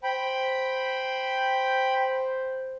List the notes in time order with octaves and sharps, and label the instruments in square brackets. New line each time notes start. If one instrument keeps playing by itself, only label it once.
[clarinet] C5 [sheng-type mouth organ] G5 B5